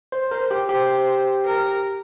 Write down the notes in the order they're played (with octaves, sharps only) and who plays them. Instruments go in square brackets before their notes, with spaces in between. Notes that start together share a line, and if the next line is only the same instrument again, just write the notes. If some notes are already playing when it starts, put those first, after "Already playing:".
[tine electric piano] C5
[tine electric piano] A#4 [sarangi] C5
[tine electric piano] G4
[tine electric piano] G4 [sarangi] C5
[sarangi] A#4